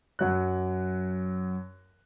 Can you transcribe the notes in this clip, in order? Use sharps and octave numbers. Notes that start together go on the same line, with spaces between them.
F#2 F#3 F#6